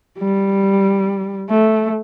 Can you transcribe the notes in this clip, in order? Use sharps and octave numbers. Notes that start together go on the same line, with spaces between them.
G3
A3